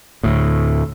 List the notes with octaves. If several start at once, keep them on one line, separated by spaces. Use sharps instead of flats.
D2 A2